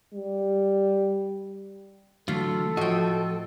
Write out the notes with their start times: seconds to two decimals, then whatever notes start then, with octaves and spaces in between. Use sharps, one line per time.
0.14 G3
2.28 D3 E3 F#3 A3 F4 A4
2.77 A2 F3 F#4 D#5 G5